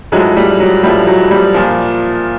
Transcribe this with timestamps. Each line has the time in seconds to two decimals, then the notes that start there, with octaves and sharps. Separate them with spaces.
0.12 A2 F3 F#3 G#3
0.37 G3
0.60 F#3
0.83 A2 F3 G3
1.07 F#3
1.31 G3
1.54 A#2 F3